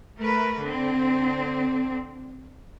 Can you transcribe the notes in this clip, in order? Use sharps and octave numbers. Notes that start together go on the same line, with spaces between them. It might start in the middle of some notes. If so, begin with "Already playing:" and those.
A3 A#4 B4
D3 C4